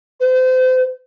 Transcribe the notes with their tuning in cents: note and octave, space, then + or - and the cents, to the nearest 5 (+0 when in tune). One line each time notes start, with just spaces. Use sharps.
C5 -35